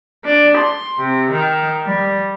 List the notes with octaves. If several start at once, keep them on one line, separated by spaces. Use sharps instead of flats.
D4
C6
C3
D#3
G3